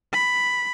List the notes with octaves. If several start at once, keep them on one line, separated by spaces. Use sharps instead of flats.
B5